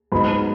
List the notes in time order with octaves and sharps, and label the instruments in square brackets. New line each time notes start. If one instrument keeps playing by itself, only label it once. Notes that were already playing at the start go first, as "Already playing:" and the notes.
[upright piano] G#2 F#3 B3 D#4 [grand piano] B5